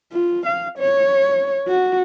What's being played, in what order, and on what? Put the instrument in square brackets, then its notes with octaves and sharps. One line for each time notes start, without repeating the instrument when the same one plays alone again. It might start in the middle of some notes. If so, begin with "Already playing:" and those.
[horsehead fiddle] F4
F5
C#5
F#4